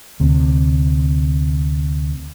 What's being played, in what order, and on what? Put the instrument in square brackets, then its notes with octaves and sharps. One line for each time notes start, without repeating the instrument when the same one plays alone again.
[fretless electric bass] D2 C3